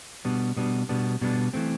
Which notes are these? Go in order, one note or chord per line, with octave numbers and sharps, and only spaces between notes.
B2 G3 B3 D4
B2 G3 B3 D4
B2 G3 B3 D4
B2 G3 B3 D4
E3 A3 C4